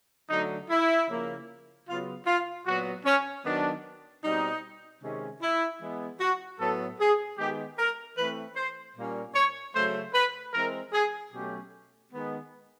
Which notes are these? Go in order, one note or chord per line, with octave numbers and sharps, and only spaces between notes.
D3 F#3 A3 D#4
E4
C#3 F3 A#3 C#4
C#3 F#3 B3 F4
F4
A#2 F#3 B3 F#4
C#4
D#3 F#3 B3 D4
B2 G3 C4 D#4
C3 D#3 G#3 C#4
E4
E3 G#3 B3
F#4
A2 F#3 B3 A4
G#4
D#3 G#3 B3 G4
A#4
E3 A3 C4 B4
C5
A#2 G3 A#3 C#4
C#5
C#3 F#3 A3 C5
B4
E3 G#3 C4 A#4
G#4
B2 F#3 A3 C#4 G4
D#3 G#3 B3